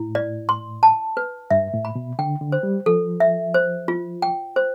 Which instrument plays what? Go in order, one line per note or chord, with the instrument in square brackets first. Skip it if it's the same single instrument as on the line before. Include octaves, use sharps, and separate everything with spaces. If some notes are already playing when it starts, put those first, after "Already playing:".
Already playing: [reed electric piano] A2 [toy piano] E4
[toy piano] D5
C6
A5
B4
[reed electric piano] G2 [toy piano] E5
[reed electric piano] A2
[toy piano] B5
[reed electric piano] B2
[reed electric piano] D3 [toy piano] G5
[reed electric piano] D3
[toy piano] C5
[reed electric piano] G3
[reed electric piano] F3 [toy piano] A4
[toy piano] E5
C5
F4
G5
C5